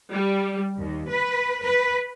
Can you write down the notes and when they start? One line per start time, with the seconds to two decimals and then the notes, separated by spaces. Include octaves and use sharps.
0.12 G3
0.78 D#2
1.11 B4
1.62 B4